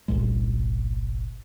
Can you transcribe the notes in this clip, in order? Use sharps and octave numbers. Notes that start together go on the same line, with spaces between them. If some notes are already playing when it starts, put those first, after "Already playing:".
G1 C2 A#2 G#3